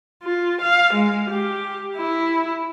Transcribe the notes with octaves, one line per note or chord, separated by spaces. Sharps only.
F4
F5
G#3
G4
E4